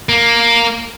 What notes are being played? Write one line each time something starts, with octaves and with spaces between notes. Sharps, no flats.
A#3